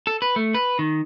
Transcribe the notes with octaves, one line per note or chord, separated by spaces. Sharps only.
A4
B4
A3
B4
D#3